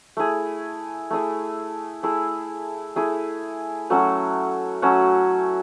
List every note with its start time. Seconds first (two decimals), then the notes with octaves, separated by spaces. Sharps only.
0.17 A3 E4 G#4
1.10 A3 E4 G#4
2.03 A3 E4 G#4
2.96 A3 E4 G#4
3.90 F#3 A3 C#4 F#4
4.82 F#3 A3 C#4 F#4